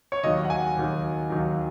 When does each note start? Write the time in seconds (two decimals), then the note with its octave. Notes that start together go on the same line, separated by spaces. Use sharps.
0.12 C#5
0.24 D#2 D#3 F#3 D#5
0.45 F#5
0.50 G#5
0.77 D#2 D#3 F#3
1.30 D#2 D#3 F#3